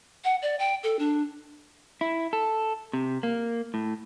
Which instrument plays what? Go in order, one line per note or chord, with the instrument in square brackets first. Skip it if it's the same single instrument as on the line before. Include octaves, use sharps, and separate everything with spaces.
[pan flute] F#5
D5
G5
A4
D4
[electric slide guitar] E4
A4
C3
A#3
A2